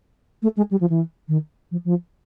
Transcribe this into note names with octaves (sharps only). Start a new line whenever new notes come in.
A3
G#3
G3
F3
E3
D#3
F3
F3